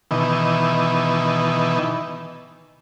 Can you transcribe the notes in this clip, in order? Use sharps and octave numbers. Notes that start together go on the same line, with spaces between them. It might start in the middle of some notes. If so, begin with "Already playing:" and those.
B2 D#3 E3